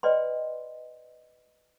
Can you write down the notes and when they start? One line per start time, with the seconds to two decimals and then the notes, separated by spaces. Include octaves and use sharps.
0.03 B4 D5 D#5 G5 B5 C6